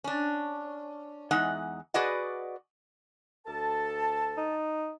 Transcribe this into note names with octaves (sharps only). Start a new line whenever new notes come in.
C#4 D4
E2 G#3 D#4 F#5
F#4 G#4 B4 D5 D#5 F#5
D2 A4 A5
D#4